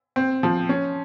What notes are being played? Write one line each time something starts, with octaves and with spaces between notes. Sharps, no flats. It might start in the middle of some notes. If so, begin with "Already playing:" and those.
C4
F3
C#4